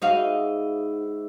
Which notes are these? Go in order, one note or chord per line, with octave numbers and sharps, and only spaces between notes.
G#2 D#4 E4 F#4 F5